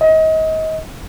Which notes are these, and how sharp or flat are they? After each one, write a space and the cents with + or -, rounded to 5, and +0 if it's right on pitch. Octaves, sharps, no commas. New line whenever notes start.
D#5 +30